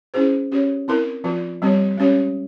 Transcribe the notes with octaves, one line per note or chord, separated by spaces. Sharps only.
C#4 E4 G#4 C5
C#4 G4 C#5
C4 E4 A#4
F3 C4 F4
G3 C4 G4 C#5
G#3 C#4 G4 C#5